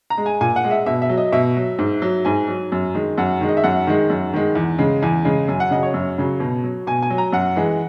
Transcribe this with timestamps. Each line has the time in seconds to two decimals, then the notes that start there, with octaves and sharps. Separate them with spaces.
0.10 A#5
0.18 G#3
0.26 G#5
0.41 A#2 G#5
0.56 F#5
0.64 G#3
0.71 E5
0.86 B2 E5
1.02 E5
1.09 F#3
1.17 D#5
1.32 B2 E5
1.57 F#3
1.79 G#2
2.02 F#3
2.25 G#2 G#5
2.48 F#3
2.72 F#2
2.94 D#3 G#3
3.18 F#2 F#5
3.41 D#3 G#3
3.49 D#5
3.57 E5
3.64 F#2 F#5
3.87 D#3 G#3
4.10 F#2
4.33 D#3 G#3
4.55 E2
4.79 C#3 G#3
5.02 E2 G#5
5.25 C#3 G#3
5.48 F#2 G#5
5.60 F#5
5.71 C#3 F#3 D#5
5.83 C#5
5.94 F#2
6.18 C#3 F#3
6.40 B2
6.64 F#3
6.87 B2 G#5
7.02 G#5
7.10 F#3
7.18 A#5
7.32 F#2 F#5
7.56 E3 G#3